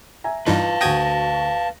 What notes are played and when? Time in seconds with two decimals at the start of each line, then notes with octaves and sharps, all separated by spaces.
0.24 E5 G#5 A#5
0.46 G2 E3 D#4 F4 B4 F5 A5
0.81 D2 F#4 G5 D#6 G#6 A#6